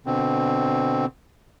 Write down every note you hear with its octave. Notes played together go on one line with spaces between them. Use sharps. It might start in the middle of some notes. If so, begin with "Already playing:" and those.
B2 D3 C4